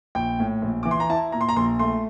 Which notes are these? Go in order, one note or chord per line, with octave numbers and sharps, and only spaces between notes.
A#1 G5
A2
A#1
E3 D6
C6
A#5
E4 A5
A#2 A#5
C6
A#5
A#1 C6
A3 C6